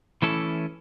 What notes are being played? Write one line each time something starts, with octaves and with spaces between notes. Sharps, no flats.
E3 A3 C#4 E4 A4